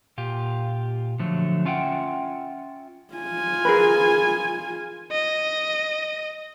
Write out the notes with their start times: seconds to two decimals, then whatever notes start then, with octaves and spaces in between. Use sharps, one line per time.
0.18 A#2 F4 G4
1.20 D3 F3 F#3 A3
1.65 C#4 F4 E5 F#5 G5
3.14 F4 G#5
3.65 G#4 A#4 B4
5.11 D#5